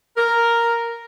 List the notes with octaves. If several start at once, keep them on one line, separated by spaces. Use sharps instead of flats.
A#4